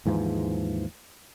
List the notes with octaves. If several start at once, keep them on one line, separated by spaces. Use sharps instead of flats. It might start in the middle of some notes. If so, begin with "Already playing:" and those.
D#2 G#2 E3 F3